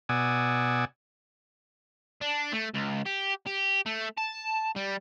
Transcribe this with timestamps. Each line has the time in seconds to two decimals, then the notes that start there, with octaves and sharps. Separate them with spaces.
0.09 B2 D5 F#5 G#5 D#6 E6
2.21 D4
2.53 A3
2.75 C#2
3.06 G4
3.46 G4
3.86 A3
4.18 A5
4.76 G3